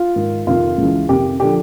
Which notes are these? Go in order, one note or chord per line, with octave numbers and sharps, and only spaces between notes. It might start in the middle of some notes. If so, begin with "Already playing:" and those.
Already playing: F4
G#2 D#3
F2 C3 D#3 F4
C#2 C#3 E3
F2 C3 D#3 G4
D3 F3 G4